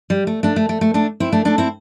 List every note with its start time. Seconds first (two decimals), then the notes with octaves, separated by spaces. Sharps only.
0.10 G3
0.27 A3
0.43 A3 D4
0.56 A3
0.69 A3
0.81 A3
0.94 A3 D4
1.20 C4 E4
1.32 A3 D4
1.45 A3 D4
1.58 C4 E4